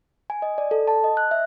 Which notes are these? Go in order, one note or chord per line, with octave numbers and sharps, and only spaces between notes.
G#5
D#5
D5
A4
A5
D#5
F#6
E5